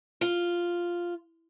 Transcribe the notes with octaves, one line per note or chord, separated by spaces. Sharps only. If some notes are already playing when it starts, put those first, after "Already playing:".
F4